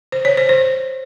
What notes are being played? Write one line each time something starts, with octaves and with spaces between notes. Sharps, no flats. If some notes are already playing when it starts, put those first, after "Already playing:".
C5
C#5
C5
C5